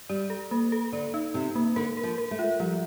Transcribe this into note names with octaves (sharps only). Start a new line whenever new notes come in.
G3 D5
A4
A#3
A4
D3 D5
D#4
C3 D#4
A#3
D3 A#4
A#4
F3
A#4
A3
F4
F3 G3